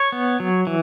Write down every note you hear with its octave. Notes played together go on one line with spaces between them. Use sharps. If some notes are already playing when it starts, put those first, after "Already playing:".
Already playing: C#5
B3
F#3
E3